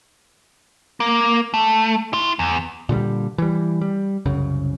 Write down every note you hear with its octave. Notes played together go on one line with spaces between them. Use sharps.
A#3
A3
E4 C6
E2
A#2 D3 F#3 G3
E3 G3
G3
C2 F#2 C#3